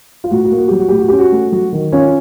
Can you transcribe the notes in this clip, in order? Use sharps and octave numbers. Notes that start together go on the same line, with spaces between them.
F4
A2 F#4
F#4
A#3
F#4
F#3 G4
F#4
A2 G4
F#4
C#4 G4
F#4
A3
F#3 F#4
D#3
C#4 F4 C#5